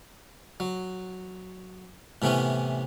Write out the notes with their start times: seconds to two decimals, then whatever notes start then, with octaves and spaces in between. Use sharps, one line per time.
0.60 F#3
2.22 A2 C3 E3 B3 C#4